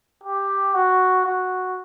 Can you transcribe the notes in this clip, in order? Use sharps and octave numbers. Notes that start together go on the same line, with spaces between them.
G4
F#4
F#4